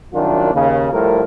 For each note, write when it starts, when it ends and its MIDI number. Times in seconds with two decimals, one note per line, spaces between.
0.14 0.52 36
0.14 0.52 42
0.14 0.52 51
0.14 0.52 54
0.14 0.52 62
0.14 0.52 65
0.53 0.90 39
0.53 0.90 49
0.92 1.23 45
0.92 1.23 53
0.92 1.23 55
0.92 1.23 57
0.92 1.23 70